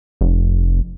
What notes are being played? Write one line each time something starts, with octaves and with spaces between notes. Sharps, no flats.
F1